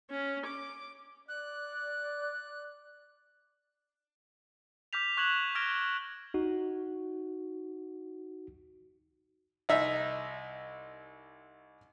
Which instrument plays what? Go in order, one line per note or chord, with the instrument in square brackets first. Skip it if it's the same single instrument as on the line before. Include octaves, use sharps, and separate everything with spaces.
[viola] C#4
D6
[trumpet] D5 [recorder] F#6
[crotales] D6 F6 G6 B6 F7
C#6 F#6 G#6 E7 F#7
D6 F6 G#6 A#6 D7 G7
[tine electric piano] D#4 F#4
[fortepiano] C2 D#4 E5